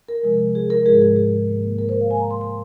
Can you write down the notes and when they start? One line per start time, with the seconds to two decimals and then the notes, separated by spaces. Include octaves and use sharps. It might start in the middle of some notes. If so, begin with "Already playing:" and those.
0.09 A#4
0.23 C3 F3 G#3
0.55 G#4
0.70 A#4
0.86 G#2 F3 G#3 G#4
1.02 G#4
1.16 G#4
1.48 G#2 D#3 A#3
1.79 A#4
1.89 C5
2.01 F5
2.10 G#2 G#3 G#5
2.20 A#5
2.30 C6
2.41 C6